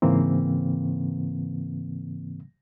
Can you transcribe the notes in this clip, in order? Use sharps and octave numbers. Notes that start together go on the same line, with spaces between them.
G#2 C#3 E3 A#3 C4